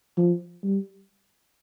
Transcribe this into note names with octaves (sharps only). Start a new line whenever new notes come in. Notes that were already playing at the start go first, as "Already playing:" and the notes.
F3
G3